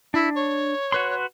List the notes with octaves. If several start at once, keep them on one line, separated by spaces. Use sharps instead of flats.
D4 E4
C#5
F#4 B4 C6